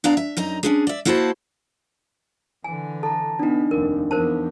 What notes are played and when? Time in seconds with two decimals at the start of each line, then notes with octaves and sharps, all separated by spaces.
0.04 B3 D4 D5 F5 A#5
0.17 E5
0.37 F#2 D#4 A#5
0.63 C#4 D4 G#4
0.87 D5 E5
1.05 A#3 E4 F#4 C5 G#5 A5
2.64 D3 E3 G#5
3.03 A4 A5 A#5
3.39 B3 D4 D#4
3.71 F1 D#2 A#4
4.11 E2 F3 A#4 C5 A5